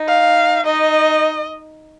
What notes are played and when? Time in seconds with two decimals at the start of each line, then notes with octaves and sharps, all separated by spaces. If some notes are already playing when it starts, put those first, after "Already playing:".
Already playing: D#4
0.08 F5
0.65 D#4 D#5